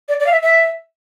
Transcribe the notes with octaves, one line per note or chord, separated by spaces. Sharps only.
D5
D5
F5
E5
E5